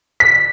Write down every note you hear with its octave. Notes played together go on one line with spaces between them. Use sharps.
B6